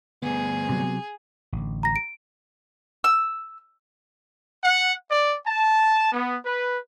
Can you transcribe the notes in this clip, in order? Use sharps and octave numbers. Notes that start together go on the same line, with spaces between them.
D2 G2 B3 G#4
C3 F#3
A1 D3
A#5 A#6
D7
E6
F#5
D5
A5
B3
B4